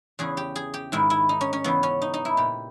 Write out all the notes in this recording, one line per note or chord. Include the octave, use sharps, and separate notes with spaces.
E2 C#3 E3 G#4
G4
G#4
G4
G#2 D#3 E4
E4
D#4
C#4
C#4
E2 C#3 E3 B3
C#4
D#4
D#4
E4
A#2 G4